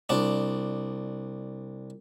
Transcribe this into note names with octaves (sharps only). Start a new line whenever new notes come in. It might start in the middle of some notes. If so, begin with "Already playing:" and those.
C2 D4